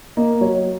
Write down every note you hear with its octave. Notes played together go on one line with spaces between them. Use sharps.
A#3 D#5
F#3 C#5